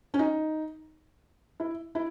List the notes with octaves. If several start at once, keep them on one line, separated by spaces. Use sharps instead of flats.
C#4
D#4
E4
E4